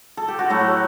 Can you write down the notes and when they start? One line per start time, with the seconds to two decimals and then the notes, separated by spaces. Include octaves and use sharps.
0.17 A4
0.28 G4
0.39 F#4
0.50 A2 F#3 A3 E4